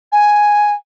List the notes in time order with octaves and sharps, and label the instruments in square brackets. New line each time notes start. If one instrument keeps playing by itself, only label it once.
[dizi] G#5